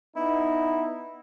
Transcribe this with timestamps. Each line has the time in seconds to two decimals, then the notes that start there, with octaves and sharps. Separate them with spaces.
0.16 B3 D#4 E4